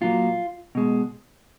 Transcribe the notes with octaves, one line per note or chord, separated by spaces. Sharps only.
A#2 F#3 A#3 F4
B2 G#3